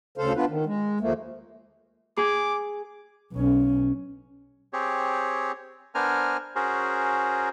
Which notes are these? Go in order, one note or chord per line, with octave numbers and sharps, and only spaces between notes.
D2 C#3 A4 C5 F5
B3 D4 F4 B4
D#3
G#3
D#2 F3 A3 A#3
G#4 D6
B1 C#4
C4 G4 G#4 C#5
B3 D4 A#4 C5 G#5 F6
C#4 F#4 G#4 A#4 C5